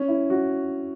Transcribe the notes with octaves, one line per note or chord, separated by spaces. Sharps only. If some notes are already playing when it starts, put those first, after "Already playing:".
Already playing: C#4
E4
F#4